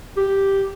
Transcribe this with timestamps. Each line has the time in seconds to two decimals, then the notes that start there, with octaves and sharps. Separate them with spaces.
0.17 G4